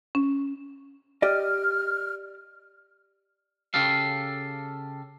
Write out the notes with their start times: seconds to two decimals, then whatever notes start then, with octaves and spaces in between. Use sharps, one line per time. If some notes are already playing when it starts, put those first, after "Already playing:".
0.15 C#4
1.22 G4 D5 D#5 F6
3.74 C#3 G4 A4 F5